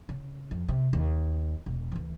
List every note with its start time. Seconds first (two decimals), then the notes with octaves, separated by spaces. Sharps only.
0.09 C#3
0.51 F2
0.68 C3
0.93 D#2
1.66 E1
1.92 D2 E3